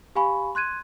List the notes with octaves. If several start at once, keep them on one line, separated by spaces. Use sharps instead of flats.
G4 F5 G#5 B5 C#6
C6 F#6 G#6 D#7